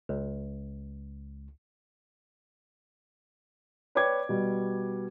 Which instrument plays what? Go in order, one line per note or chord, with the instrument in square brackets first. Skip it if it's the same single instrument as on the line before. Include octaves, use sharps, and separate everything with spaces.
[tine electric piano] C#2
[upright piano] B4 C#5 D5 G5 D6 G#6
B2 G3